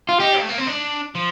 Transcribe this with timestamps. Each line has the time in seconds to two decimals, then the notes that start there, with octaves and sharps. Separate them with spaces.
0.09 F4
0.20 D#4 G4
0.39 A3
0.49 A#3
0.58 C4
0.67 D4
1.15 F3